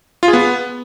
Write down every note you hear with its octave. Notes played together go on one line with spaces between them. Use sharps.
F4
G#4
B3